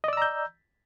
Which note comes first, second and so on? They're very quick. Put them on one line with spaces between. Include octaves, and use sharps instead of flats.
D#5 D5 E6 A#5 G6